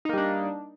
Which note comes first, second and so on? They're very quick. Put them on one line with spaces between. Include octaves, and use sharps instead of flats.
D#4 A#3 G3 D4